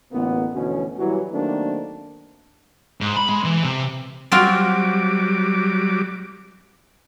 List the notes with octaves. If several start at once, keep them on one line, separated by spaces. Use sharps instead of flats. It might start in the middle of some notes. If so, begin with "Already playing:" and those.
A1 D2 A#3 B3
D2 B2 E3 F3 C#4
E3 F#3 G3
D#3 F#3 A3 A#3 C4 D4
G#2
B5
G#3
E3
C3
F#3 G3 C4 F4 F#4 D6